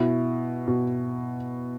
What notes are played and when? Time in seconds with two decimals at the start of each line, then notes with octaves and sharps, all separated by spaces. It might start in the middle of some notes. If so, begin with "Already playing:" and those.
Already playing: B2 E4
0.68 B2